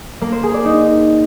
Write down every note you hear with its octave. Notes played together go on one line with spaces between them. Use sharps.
A#3
C5
G#4
D5
D#4